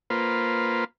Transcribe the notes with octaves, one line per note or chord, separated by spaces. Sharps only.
A#3 F4 B4 C5